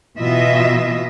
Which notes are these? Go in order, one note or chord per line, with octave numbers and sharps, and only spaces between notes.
B2 E3 F4 D#5 E5